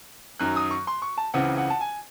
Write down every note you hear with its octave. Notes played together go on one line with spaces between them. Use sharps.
F#2 D#3 F#3 F#6
D#6
C#6
C6
C#6
A5
C#2 C#3 E3 C4 F#5
F#5
A5
G#5